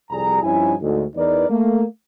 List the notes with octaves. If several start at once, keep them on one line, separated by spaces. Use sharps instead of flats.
C2 F2 G3 G#4 A#5
G2 F3 C#4 D#4 E4 G#5
D2 G#2
E2 E3 D#4 A#4 B4 D5
A3 A#3